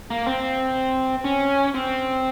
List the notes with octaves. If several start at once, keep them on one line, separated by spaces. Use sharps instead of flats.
A#3
C4
C#4
C4